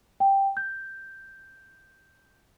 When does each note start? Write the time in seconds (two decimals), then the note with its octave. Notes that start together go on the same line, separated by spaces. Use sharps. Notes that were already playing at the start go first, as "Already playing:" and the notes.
0.20 G5
0.57 G6